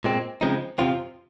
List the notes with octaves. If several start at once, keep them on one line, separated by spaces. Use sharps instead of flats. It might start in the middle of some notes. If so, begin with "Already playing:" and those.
A#2 G#3 C4
C#3 F3 G#3 C4 D#4
F2 C3 F3 C4 F4